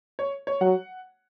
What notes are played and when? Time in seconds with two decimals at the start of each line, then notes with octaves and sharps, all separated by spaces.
0.19 C#5
0.47 C#5
0.61 F#3 F#5